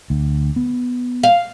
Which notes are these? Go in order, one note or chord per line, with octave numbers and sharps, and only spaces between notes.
D2
B3
F5